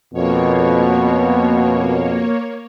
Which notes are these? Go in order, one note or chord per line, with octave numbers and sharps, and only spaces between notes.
F2 B2 A#3 C#5